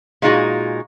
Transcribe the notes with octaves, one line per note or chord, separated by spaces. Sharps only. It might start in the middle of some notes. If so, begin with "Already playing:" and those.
A#2 G#3 D#4 F4 F#4 G#4